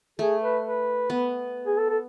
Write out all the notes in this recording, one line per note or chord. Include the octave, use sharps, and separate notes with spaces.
A3 G#4
B4
B4
B3
G#4
A4
A4